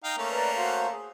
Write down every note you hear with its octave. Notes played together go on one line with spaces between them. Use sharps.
D#4 F5 G5
A3 A#3 C#4
B4 D5 A#5
F#4 C5 F5
G#4